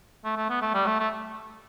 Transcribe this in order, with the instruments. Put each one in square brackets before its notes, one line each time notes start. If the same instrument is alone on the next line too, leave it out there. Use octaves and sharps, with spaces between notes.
[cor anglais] A3
A3
B3
A3
G3
A3
A3